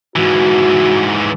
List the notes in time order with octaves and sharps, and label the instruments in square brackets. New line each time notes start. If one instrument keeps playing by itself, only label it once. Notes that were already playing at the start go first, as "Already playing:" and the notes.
[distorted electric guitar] G#2 E3 [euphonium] F#4